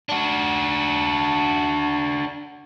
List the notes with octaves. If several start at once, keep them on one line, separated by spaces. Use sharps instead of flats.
D4 F#4